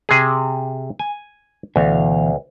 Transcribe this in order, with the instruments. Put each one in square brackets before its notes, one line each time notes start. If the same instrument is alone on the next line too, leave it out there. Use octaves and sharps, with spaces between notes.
[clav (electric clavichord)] C3 G#4
G#5
[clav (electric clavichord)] D2 [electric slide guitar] B2 E3 F5